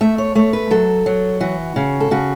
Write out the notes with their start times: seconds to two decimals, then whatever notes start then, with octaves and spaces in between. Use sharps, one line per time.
0.01 A3 E5
0.18 C#5
0.35 A3 C#5
0.53 B4
0.71 F#3 A4
1.06 F#3
1.40 E3 F#4
1.76 C#3
2.00 A4
2.11 C#3 F#4